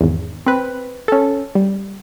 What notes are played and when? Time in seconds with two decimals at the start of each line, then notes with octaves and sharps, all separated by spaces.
0.01 G#1 E2
0.46 C4 B4
1.08 C#4 A4
1.55 G3